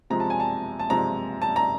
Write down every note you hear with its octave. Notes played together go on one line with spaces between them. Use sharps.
C3 F3 G#3 A#5
A5
G#5
A5
A5
C3 F3 G#3 A#5
A5
A#5